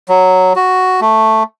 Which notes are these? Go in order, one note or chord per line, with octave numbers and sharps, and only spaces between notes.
F#3
F#4
A3